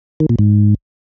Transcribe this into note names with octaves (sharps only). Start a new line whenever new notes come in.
D#3
A#2
G#2